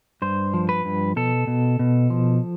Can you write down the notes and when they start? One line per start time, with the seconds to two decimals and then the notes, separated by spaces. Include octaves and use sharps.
0.22 G2 C5
0.54 F3
0.69 B4
0.85 G2
1.16 B2 A4
1.47 B2
1.79 B2
2.10 F3